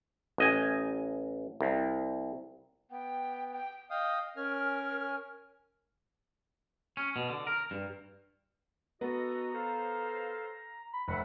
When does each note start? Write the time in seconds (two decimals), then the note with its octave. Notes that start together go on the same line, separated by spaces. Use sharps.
0.38 A1 D#5 G#5
1.61 C2
2.91 B3 G5
3.52 G5
3.90 D#5 F5 G5 D#6
4.37 C#4 A#4 G#5 F6
6.97 C#4
7.16 B2
7.30 D3
7.47 A#4
7.71 G2
9.01 B3 F#4 A4 D#5 A#5
9.53 A4 C5 F5
10.93 B5
11.08 F1 E5 F#5 B5